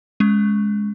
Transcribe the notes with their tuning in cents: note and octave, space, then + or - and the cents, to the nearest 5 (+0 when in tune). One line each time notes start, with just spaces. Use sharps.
G#3 +0 C#4 +0